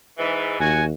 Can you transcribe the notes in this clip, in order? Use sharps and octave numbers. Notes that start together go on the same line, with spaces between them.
G#2 E3
D#2 F#4 G#5